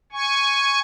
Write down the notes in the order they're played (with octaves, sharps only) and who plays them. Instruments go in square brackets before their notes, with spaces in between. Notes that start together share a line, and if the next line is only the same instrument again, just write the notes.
[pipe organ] G#5 C#6